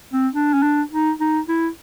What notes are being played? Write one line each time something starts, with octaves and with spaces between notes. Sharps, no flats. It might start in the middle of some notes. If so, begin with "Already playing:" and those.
C4
D4
C#4
D4
D#4
D#4
E4